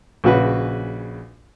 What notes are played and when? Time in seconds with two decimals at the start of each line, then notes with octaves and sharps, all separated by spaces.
0.24 A#1 C#3 F#4 B4